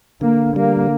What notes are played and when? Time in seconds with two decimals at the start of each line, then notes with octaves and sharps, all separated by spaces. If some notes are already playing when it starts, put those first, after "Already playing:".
0.21 D3 A#3
0.56 G3 A#3